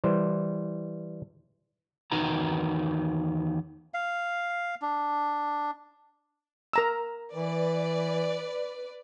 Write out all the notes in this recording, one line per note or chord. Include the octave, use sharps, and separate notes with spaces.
E3 G3 C5
E2 D#3 D#4 F#4 B4 A#5
F5
D4
A#4 A#5 E6
E3 B4 D5